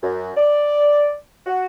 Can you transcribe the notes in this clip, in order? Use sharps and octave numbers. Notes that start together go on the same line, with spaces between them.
F#2
D5
F#4